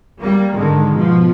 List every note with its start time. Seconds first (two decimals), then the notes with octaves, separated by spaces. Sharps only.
0.21 G3 A#3
0.55 G#2 D3 D#3 G#3
0.95 B2 F3